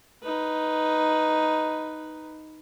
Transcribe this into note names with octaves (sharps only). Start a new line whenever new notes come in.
D#4 B4